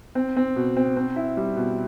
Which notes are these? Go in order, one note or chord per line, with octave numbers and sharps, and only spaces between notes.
C4
C4
B2
C4
C4
E4
G3
B2